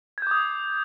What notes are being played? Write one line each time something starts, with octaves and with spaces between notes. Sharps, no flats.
D6 D#6 G6 G#6